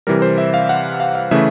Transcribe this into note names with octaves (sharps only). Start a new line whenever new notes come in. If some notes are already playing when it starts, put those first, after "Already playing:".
C3 E3 G3 A#4
C5
E5
F5
F#5
F5
F5
C#3 E3 A3 E5